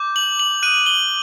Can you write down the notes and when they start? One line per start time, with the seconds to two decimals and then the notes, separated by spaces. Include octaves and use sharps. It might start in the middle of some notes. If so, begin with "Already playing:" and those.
Already playing: D6 G6
0.16 F#7
0.40 F#7
0.62 D#6 F#6 D#7
0.86 G7